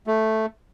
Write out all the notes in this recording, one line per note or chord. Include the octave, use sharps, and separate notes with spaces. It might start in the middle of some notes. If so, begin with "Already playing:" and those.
A3